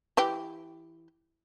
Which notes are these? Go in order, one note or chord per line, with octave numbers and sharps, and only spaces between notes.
E3 G4 G5